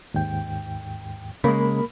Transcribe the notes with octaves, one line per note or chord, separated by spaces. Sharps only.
D#2 G#2 G5
C#3 G#3 A#3 A#4 B5